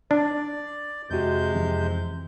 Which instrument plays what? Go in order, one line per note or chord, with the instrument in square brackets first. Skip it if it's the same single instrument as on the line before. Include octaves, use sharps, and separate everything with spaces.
[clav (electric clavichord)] D4 [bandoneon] D5
[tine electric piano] F2 F#4 [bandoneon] C3 G#3 G6
[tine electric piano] F2 E3